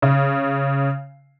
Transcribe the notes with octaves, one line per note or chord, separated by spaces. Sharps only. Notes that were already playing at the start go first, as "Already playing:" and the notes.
C#3